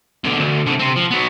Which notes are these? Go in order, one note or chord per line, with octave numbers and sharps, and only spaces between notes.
B1 D3
D2
C2 D3
C3 C4
F3
F#3 B3